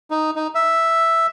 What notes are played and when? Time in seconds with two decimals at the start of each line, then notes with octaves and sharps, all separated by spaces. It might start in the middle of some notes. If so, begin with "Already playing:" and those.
0.10 D#4
0.36 D#4
0.55 E5